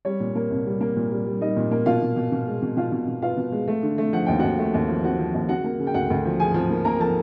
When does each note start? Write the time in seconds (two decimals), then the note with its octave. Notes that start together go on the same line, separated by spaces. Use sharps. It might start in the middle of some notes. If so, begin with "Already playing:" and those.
0.05 G3 C#5
0.20 A#2
0.35 A#3
0.50 C2
0.66 G3
0.81 A#3
0.96 A#2
1.11 G3
1.26 G3
1.41 G3 D#4 D#5
1.57 A#2
1.71 A#3
1.86 B2 F4 F5
2.02 B2
2.16 B2
2.32 B2
2.47 G#3
2.62 B2
2.77 B2 F4 F5
2.92 B2
3.08 B2
3.22 B3 F4 F5
3.37 B2
3.52 G#3
3.68 A3
3.83 D3
3.98 A3
4.13 F3 F#5
4.26 D#2 G5
4.39 D#2 F#4 F#5
4.59 A3
4.74 D#2
4.89 F3
5.04 F3 F#4 F#5
5.19 F3
5.34 D#2
5.49 C#3 F#4 F#5
5.64 A#3
5.80 C#3
5.87 G5
5.94 D2 F#4 F#5
6.10 D2
6.25 F3
6.40 F3 G#4 G#5
6.54 F3
6.70 A#3
6.85 A#3 A#4 A#5
7.00 F3 A4 A5